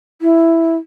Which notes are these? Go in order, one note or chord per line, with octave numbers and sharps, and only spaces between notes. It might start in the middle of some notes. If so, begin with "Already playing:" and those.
E4